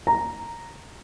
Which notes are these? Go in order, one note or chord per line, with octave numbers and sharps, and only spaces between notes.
A#5